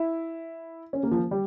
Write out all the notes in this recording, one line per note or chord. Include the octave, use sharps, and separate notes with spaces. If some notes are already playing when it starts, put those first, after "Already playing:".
Already playing: E4
C#4
A#3
F3
G3